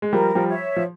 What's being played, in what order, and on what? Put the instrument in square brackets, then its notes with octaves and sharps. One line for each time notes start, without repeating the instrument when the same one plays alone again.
[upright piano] G#3
[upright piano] F3 G3 [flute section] A#4
[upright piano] F3 G3
[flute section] C#5 E5
[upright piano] F3